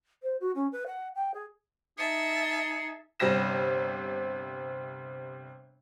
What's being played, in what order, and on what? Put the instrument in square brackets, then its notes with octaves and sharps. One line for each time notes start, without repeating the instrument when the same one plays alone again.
[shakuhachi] C5
F#4
C#4
B4
F#5
G5
G#4
[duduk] D#4 [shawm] G#4 [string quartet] E5 A5 [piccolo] C#7
[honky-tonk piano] G1 C3 G3 A#6 E7